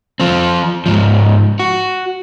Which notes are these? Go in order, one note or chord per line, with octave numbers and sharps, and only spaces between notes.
F3 C4
G#2 F3
F#4